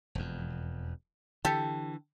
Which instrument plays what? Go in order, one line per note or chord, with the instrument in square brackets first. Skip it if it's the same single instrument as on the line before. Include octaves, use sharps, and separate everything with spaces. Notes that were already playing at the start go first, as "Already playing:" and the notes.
[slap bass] E1 F2
[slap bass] D3 E3 [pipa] G4 A4